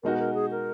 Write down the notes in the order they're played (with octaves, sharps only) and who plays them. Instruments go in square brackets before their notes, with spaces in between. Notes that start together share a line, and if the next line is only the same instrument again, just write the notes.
[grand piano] B2 G#3 D#4 F#4 [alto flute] A#4
[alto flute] A#4
G#4
A#4